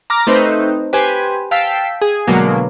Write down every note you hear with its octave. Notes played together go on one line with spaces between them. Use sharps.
A#5 D6 F6 A#6
A3 C4 D#4 B4 C5
G4 B4 C5 G#5
F5 G5 A5 E6 B6
G#4
B2 D3 F#3 G#3 A#3 B3